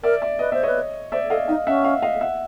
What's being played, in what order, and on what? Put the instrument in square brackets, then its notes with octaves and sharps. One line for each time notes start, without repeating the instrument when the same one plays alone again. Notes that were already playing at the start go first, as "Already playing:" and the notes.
[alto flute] A#4 [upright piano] D5 E5
[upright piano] D5 E5
[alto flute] B4 [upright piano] D#5
[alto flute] C5 [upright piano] E5
[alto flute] B4 [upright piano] C#5 D#5
[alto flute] C5 [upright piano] D5 E5
[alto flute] A4 [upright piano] D#5 F5
[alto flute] D#4 [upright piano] D#5 F5
[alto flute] C#4 [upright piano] E5 F#5
[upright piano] D#5 F5
D#5 F5
E5 F#5